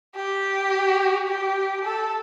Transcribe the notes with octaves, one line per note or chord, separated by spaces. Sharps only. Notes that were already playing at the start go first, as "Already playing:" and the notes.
G4
G4
A4